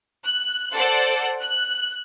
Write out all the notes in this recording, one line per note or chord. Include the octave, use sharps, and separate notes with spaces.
F#6
A4 C5 D5 F#5
F#6